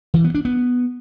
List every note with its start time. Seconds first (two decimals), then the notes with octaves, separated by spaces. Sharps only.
0.14 E3
0.24 B3
0.35 D4
0.45 B3